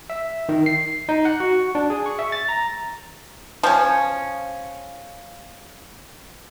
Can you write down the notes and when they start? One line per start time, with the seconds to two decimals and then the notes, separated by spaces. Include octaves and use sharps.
0.10 E5
0.49 D#3
0.66 C7
1.09 D#4
1.25 F#5
1.40 F#4
1.75 D4
1.90 G#4
2.06 C#6
2.19 E5
2.32 A6
2.49 A#5
3.63 F3 C#4